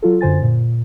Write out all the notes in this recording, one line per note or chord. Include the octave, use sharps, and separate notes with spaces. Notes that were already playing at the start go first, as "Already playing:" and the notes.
F#3 F4 A4
F#2 D3 C5 G#5 A6
A#2